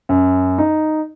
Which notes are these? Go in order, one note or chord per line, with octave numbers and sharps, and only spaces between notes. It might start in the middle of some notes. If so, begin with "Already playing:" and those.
F#2
D#4